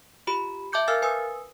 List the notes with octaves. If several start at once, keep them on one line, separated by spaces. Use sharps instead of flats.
F4 G4 B5
E5 A5 D6 G6 C#7
A#4 F5 G#5 E6 F6 A6
B4 G#5 D#6 E6